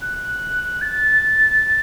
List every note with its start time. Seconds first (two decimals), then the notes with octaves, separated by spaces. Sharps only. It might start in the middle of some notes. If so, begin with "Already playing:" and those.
0.02 F#6
0.81 A6